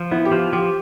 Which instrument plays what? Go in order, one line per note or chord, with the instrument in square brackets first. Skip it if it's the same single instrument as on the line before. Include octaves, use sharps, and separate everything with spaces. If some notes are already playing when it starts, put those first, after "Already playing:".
Already playing: [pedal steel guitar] F3
[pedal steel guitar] B3 [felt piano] E4
[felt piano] G4
[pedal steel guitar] F3 [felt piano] F4
[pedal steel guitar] F3 [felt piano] G4